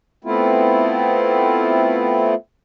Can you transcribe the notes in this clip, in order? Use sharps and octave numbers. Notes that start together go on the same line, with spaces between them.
A3 B3 C4 E4 F4